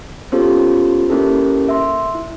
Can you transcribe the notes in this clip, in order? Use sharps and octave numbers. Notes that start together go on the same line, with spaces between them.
B3 C#4 F4 G4 A4 C5
A#3 C#4 E4 G4 A4 A#4
E5 C6
E4